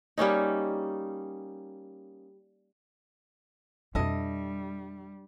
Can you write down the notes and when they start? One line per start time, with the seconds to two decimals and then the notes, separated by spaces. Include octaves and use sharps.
0.18 G3 A#3 C#4 D#4
3.95 F2 B2 G3 D4 E4 A4 D#5